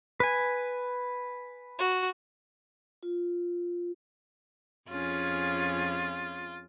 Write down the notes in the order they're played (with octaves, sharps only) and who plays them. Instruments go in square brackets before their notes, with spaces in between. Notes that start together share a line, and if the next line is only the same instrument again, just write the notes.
[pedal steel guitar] B4 G#5
[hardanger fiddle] F#4
[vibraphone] F4
[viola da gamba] F2 C#4 G#4 [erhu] F4